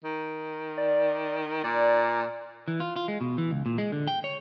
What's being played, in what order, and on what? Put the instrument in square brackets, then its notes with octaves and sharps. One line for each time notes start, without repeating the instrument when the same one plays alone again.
[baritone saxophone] D#3
[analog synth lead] D5
[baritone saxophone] A#2 [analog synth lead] D5
[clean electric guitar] E3
F4
F4
G#3
B2
E3
C#2
A#2
G#3
D3
G5
C#5